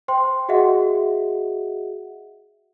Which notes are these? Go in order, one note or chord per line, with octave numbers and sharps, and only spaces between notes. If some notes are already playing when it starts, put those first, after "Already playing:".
C5 G5 C6
F#4 G#4 D#5 E5 F#5